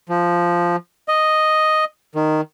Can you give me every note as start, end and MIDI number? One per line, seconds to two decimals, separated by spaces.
0.09 0.76 53
1.08 1.85 75
2.15 2.41 51